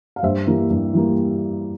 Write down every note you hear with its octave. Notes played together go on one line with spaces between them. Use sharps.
F5
G2 C5 E5
E3 G3 A#3
G2
E3 G3 A#3